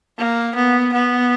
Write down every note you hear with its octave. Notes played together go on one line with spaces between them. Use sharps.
A#3
B3
B3